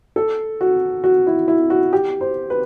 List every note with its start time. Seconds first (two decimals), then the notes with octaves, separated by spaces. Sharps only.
0.16 A4
0.61 F#4
1.04 F#4
1.27 E4
1.48 E4
1.70 F#4
1.93 G4
2.21 C5
2.50 B4